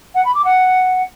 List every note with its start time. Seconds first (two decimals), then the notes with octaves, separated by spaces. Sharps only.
0.14 F#5
0.24 B5
0.34 D6
0.44 F#5